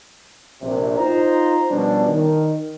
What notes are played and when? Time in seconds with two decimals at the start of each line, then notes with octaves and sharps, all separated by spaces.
0.61 A#1 C3
0.98 D#4 F4 C5 A#5
1.70 B2 F3 G3 C#4 D4
2.08 D#3